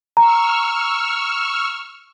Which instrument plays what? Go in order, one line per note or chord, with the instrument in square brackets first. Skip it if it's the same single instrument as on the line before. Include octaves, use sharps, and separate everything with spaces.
[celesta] A#5 [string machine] C#6 E6 F6